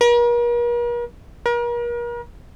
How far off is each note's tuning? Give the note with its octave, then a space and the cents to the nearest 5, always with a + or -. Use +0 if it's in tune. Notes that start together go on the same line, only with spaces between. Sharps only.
A#4 +45
A#4 +40